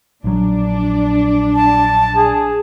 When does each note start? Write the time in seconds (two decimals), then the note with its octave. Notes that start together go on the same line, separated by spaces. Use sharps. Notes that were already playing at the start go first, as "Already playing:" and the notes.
0.24 A#1 F#3 D4
1.55 A5
2.16 G#4